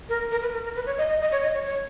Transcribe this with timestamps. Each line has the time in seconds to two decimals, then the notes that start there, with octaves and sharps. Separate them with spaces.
0.09 A#4
0.31 A#4
0.42 B4
0.53 A#4
0.64 A#4
0.76 B4
0.86 C#5
0.98 D#5
1.09 D#5
1.21 D#5
1.32 C#5
1.42 D#5
1.54 C#5
1.65 C#5